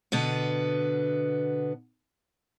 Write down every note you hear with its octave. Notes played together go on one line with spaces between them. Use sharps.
B2 D3 B3